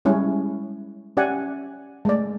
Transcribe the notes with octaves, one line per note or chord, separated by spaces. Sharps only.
G3 G#3 C#4 E4
C#4 G4 D5 E5 F#5 G#5
G#3 A3 D5